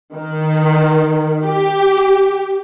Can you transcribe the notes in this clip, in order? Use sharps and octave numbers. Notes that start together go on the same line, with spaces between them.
D#3
G4